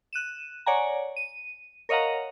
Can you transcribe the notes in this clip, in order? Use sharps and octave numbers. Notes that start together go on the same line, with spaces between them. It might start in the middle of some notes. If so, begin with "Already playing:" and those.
F#6 D#7 E7
C#5 D5 F#5 G#5 A#5
D#7
A#4 C#5 D#5 F5 F#5 A#5